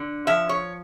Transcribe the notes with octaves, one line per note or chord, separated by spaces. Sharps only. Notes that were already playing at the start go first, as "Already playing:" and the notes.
Already playing: D3
F3 E5
C#5